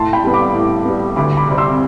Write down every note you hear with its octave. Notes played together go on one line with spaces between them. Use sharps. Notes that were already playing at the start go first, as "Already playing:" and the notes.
Already playing: A2 A5 C6
G5 B5
G3 B3
B5 D6
A2
G3 B3
D2 B5 D6
B5 D6
C3 G3 C4
C6 E6